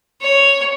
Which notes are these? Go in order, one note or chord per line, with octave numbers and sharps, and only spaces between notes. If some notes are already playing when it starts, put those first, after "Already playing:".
C#5